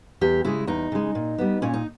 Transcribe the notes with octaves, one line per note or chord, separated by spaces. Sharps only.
E2 G4
C#3 G#3 E4
E2 D#4
C#3 G#3
A#2
G3 B3
A#2 C#4
D#4